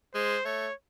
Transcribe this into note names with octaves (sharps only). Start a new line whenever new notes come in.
G#3 C5
A3 C#5